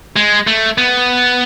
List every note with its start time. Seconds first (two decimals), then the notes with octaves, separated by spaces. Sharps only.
0.16 G#3
0.47 A3
0.78 B3